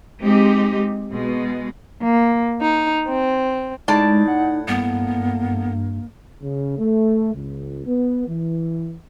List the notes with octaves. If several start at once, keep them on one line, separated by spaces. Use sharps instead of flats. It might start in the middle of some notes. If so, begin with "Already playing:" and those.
G#3 C4 D#4 G4
B2 G#3
A#3
D#4
C4
A2 G#3 D#4 D5 A5
F#5
G2 A#3 B3
C#3
A3
C#2
B3
E3